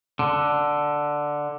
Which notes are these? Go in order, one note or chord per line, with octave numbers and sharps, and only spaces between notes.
D3